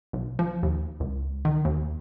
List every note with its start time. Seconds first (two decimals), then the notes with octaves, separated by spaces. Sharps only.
0.13 B1
0.39 F3
0.63 D#2
1.00 C#2
1.45 D#3
1.65 D#2